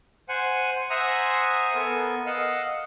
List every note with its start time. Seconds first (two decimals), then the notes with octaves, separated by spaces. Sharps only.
0.29 C5 F#5 G#5
0.90 C5 E5 F#5 G#5 A#5 D#6
1.75 B3 A4 A#4 G#5
2.26 D#5 F5 F#5 E6